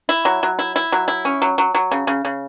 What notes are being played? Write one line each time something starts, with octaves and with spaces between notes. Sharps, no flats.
E4
F#3
F#3
E4
E4
F#3
E4
C#4
F#3
F#3
F#3
C#3
C#3
C#3